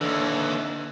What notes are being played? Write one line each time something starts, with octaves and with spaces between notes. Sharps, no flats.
D#2 D3 E3